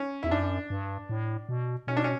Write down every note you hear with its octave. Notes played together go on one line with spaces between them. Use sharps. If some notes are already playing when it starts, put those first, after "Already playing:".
Already playing: C#4
E2 E4
F#2 D4
G2
A2
B2
B2 C#4
D4
C#4